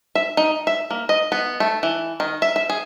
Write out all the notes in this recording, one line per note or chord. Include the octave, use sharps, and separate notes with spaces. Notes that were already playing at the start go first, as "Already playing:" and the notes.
E5
D#4
E5
A#3
D#5
B3
A3
E3
D#3
E5
E5
G#4